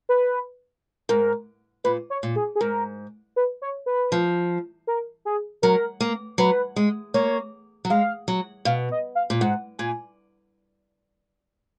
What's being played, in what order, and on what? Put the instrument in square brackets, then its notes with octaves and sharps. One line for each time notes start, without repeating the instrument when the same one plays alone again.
[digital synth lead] B4
[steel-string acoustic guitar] G#2 [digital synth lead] A#4
[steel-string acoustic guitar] A#2 [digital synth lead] B4
[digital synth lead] C#5
[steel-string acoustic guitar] A#2
[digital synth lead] G#4
G#4
[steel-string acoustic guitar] G#2 [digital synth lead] A#4
[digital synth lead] B4
C#5
B4
[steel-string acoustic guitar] F3
[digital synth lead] A#4
G#4
[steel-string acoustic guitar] F#3 [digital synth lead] A#4
[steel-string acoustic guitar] A#3
[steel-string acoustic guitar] F#3 [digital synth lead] B4
[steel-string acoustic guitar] G#3
[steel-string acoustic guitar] A#3 [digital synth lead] C#5
[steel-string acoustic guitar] F#3
[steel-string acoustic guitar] G#3 [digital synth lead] F5
[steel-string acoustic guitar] F#3
[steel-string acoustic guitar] B2 [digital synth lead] F5
[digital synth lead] D#5
F5
[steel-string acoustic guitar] A#2
[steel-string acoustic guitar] G#2 [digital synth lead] F#5
[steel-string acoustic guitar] A#2 [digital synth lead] G#5